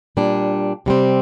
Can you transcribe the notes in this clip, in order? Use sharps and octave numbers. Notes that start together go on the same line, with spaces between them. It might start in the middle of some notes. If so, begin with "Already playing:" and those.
A#2 G3 D4
C3 G3 C4